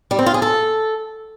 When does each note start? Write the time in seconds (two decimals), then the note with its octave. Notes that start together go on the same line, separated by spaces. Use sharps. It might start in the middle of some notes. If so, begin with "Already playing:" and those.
0.11 G3
0.19 C4
0.26 F4
0.34 G#4
0.42 A4